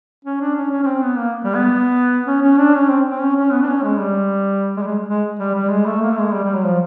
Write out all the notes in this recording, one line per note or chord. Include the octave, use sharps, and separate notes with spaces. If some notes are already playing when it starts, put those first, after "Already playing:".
C#4
D4
C#4
C#4
C#4
C4
B3
A#3
G3
B3
C#4
C#4
D4
C#4
C4
C4
C#4
C#4
B3
D4
C#4
G#3
G3
G#3
G3
G#3
G#3
G3
G3
G#3
A3
A#3
A3
G#3
G3
G3
F#3
F3